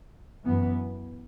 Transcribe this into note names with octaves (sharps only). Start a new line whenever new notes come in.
F#2 E3 B3